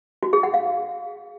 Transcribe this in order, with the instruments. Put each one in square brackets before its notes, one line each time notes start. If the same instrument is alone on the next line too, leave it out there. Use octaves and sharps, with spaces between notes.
[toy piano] F#4
G#4
F#5
F5